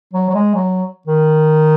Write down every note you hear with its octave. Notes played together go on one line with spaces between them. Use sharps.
F#3
F#3
G#3
F#3
D#3